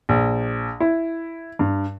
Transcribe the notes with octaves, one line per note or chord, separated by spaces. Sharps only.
A#1
E4
G2